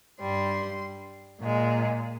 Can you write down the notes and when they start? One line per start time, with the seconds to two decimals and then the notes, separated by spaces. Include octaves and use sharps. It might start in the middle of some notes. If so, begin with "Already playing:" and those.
0.20 G2 G3 C6
1.42 A#2 G#3